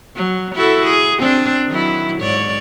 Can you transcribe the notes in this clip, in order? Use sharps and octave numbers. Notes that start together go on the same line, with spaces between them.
F#3
E4 F#4 A4
G#4
C4 D4
D#3 F#3 E4
G#2 C#5 D5